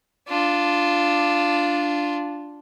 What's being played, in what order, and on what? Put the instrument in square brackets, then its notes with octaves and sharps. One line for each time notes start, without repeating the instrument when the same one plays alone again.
[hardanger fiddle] D4 F4